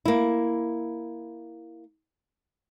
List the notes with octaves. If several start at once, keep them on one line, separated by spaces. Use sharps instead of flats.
A#3 E4